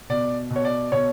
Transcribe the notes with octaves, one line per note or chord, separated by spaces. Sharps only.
B2 D5
B2
C#5
D5
B2 C#5